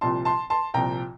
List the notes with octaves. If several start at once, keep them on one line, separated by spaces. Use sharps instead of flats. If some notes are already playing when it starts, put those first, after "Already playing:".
C2 A#2 F3 A5 C6
A5 C6
A5 C6
C2 A#2 F3 G5 A#5